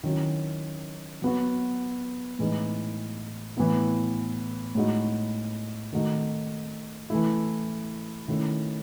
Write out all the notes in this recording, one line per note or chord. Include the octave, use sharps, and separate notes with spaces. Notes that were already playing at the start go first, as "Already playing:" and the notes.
D#3 F#3 C#4 E4
F#3 B3 F#4
A2 E3 G#3 D#4
A2 E3 B3 E4
A2 G#3 D#4 F#4
D#3 A3 D#4 F#4
E3 A3 E4
D#3 A3 C#4 E4